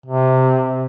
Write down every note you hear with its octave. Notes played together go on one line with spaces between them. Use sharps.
C3